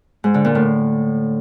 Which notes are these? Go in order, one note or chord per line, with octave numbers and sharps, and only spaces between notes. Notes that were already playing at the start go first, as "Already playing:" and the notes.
G#2
D3
A#2
A2